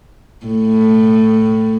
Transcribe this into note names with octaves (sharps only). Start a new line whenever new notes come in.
A2